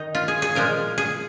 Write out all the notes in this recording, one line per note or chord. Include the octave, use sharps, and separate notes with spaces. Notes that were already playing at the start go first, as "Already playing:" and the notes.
Already playing: D#3 D#4
F4
G#4
G#4
A#2 F3 G#3 A#4
G#4